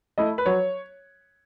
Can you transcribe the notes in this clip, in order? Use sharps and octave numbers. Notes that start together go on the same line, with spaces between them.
A3 E4 D#5
B4
F#3 C#5